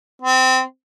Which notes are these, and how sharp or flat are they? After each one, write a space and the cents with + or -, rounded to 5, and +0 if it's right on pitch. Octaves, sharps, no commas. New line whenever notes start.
C4 -20